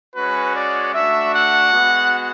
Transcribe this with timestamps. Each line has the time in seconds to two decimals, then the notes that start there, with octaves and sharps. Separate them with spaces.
0.15 G#3 C#4 F#4 B4
0.54 D5
0.94 A3 D4 F#4 E5
1.33 F#5
1.73 G#3 B3 F#4